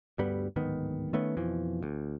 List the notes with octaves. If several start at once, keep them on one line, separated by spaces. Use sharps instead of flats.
D2 G2 G3 B3
D1 G#2 D#3 B3
D#3 A3 B3 C#4
F2 B2 E3 F3
D2